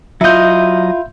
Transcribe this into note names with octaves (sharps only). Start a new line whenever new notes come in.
F#3 E4 F4 D#5 E5 G6